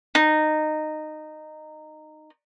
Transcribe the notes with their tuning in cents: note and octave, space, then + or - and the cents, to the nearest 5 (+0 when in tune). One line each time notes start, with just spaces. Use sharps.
D#4 -15